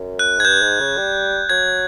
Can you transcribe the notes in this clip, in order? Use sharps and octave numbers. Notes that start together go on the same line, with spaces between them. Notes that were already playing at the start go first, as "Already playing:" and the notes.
Already playing: F#2
F#6
G#2 G#6
G2 G6
G#2
C#3
G3
F#3 G#6